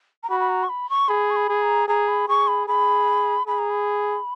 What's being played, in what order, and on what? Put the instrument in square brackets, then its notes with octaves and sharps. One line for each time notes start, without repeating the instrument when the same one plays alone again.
[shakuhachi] A#5
[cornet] F#4 [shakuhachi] B5
[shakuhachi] B5
A#5
C#6
B5
C#6
[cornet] G#4 [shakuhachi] B5
[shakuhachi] C#6
B5
[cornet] G#4
[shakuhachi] A#5
[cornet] G#4 [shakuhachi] A#5
[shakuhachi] B5
[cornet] G#4 [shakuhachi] C#6
[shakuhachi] B5
[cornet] G#4 [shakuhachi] B5
[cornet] G#4 [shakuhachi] B5
[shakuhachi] A#5
B5